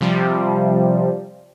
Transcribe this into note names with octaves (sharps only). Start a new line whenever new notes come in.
C3 F3 G3